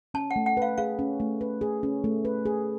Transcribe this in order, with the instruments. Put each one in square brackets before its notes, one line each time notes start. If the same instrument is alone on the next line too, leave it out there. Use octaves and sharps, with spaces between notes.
[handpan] C#4 [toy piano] A5
[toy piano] F#5
[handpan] A3
[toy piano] F#5
[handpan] B4 [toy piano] F5
[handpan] G#4 [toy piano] F5
[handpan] C#4
A3
B4
G#4
C#4
A3
B4
G#4